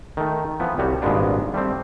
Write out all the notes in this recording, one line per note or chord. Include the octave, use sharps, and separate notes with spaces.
D#3 A3
E3 F3 B3
C2 G3 F#4 C#5
G#1 G2 A#2 G#3 B3 D4
G3 A3 C4